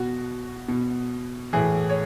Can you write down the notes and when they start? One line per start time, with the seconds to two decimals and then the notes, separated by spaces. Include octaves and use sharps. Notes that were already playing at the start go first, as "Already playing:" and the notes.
Already playing: B2 F#4
0.68 B2
1.53 A2 E3 G#4
1.90 C#5